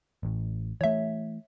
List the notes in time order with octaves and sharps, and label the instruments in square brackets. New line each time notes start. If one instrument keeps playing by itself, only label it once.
[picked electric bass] A1 A2
[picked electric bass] E3 A3 [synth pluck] C#5 E5